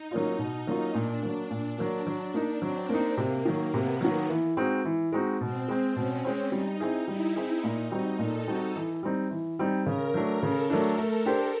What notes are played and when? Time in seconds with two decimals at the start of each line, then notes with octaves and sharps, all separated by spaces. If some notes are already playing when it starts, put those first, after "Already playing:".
Already playing: D#4
0.11 F#3 A#3 C#4 F4
0.39 B2
0.67 F#3 A#3 C#4 F4
0.94 A#2 D4
1.22 F#3 A#3
1.51 A#2
1.78 F#3 A#3
2.07 F#3 D4
2.34 A#3 D#4
2.62 F#3 C4
2.89 A#3 D#4
3.17 C3 A#3
3.45 D#3 F#3
3.73 C3 B3
4.01 D#3 F#3
4.29 E3
4.57 G#3 C4 D#4 F#4
4.85 E3
5.12 G#3 C4 D#4 F#4
5.41 B2 C4
5.68 G#3 C4
5.96 B2 C#4
6.25 G#3 C4
6.52 G3 D#4
6.80 C4 E4 G#4
7.08 G3 E4
7.36 C4 E4 G#4
7.63 A#2 D#4
7.91 G3 C4 D#4 F#4
8.19 A#2 A4
8.47 G3 C4 D#4 F#4
8.76 E3
9.03 G3 C4 D#4
9.31 E3
9.59 G3 C4 D#4
9.86 C#3 A#4
10.14 F#3 A3 D4
10.43 C#3 A4
10.70 F#3 A3 D4
10.98 A3
11.26 D4 G4 C5